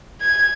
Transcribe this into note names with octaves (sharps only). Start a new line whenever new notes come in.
G#6